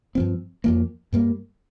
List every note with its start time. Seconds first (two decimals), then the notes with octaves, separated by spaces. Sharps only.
0.15 G2 F3 C4
0.64 F2 F3 A#3
1.13 G2 G3 A#3